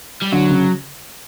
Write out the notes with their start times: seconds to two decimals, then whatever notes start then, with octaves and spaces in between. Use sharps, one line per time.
0.22 G3
0.32 D3 F#3
0.50 C#3